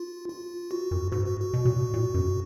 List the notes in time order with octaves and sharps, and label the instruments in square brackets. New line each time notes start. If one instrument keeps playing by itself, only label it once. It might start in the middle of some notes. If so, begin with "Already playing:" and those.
Already playing: [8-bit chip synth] F4
F4
F#4
[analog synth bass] F#2
[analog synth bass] G#2 [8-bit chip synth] F#4
[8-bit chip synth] F#4
F#4
[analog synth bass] B2
A#2
B2
A#2
F#2